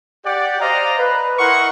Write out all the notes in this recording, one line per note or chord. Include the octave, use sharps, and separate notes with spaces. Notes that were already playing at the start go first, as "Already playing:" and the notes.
G4 D5 F#5
C5 D5 D#5 F5 A#5
B4
E4 A#4 D#5 F#5 C6 C#6